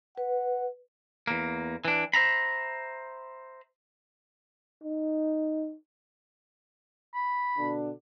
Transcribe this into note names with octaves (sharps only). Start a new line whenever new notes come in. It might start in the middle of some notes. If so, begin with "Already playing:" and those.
B4 F#5
E2 A#3
E3 D4
C5 E5 A#5 B5
D#4
B5
B2 D3 D4